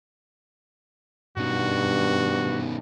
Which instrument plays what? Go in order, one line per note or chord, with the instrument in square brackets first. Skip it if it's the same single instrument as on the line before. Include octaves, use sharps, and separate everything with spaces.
[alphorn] G2 [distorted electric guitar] B2 D#3 [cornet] F#4